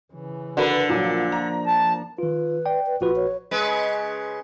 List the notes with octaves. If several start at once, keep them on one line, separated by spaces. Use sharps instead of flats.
C#3 E3
D3 F#4 A#4 B4
A#2 F3 F#3 A#3
A#5
A5
D#3 F4 B4
D5 G5
B4
A#1 F4 F#4 B4
C#5
C#3 G#3 B4